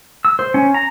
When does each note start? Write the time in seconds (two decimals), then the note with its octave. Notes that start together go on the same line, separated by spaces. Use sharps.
0.25 E6
0.39 C5
0.54 C#4
0.74 A#5